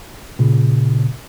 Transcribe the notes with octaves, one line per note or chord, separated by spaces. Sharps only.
A#2 C#3